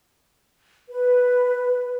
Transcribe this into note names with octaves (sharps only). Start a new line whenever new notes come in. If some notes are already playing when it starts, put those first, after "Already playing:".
B4